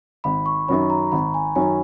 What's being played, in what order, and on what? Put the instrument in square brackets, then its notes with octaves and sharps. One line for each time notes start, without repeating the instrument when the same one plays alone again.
[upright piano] G#1 [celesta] B5
[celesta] C#6
[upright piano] F#2 D#3 F#3 C#4 [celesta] B5
[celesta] A#5
[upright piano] G#1 [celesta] B5
[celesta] G#5
[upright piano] F#2 D#3 F#3 C#4 [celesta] G#5